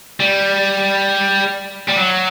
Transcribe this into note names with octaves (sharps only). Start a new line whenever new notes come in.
G3
G3
F#3